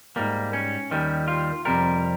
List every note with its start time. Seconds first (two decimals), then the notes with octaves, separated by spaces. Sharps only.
0.16 G#2 G3 A#3
0.53 C#4
0.91 D#2 D#3 G3
1.28 F4
1.65 F2 C3 G3 A#4